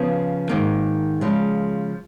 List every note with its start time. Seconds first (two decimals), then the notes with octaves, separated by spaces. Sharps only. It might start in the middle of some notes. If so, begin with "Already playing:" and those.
Already playing: C#3 F3 B3
0.49 G#2 D#3 A#3
1.21 C#3 F3 G#3